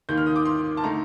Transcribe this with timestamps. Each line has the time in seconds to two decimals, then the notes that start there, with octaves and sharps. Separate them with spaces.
0.09 D#2 D#3 A#3 G6
0.17 F6
0.26 D#6
0.36 D6
0.45 C6
0.77 A5
0.84 D3 A3 D#4 A#5